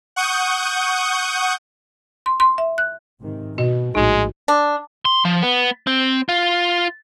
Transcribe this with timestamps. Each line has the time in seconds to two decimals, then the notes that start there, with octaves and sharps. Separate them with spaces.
0.16 F#5 C#6 D#6 G6
2.26 C6
2.40 C6
2.58 E5
2.78 F#6
3.21 G#2 C3 D#3
3.58 B2 F#4 D#5
3.95 A#1 A2 G#3 D#4 F#4
4.48 D4
5.05 C6
5.25 F3
5.43 B3
5.87 C4
6.29 F4